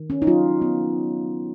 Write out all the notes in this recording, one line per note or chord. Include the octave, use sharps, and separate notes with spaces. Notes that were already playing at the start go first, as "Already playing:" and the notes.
Already playing: D#3
C#4
D#4
F#3 F4
B3